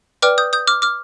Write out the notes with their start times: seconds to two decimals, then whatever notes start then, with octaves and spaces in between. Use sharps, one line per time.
0.22 B4 D5 G5 D6 F6
0.38 D#6 G6
0.53 D#6 G6
0.67 D6 F6
0.82 D6 F6